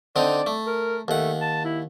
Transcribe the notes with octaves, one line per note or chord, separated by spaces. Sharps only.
D3 C4 D#4 D5
A3
A#4
D#2 A3 F#5
A5
E4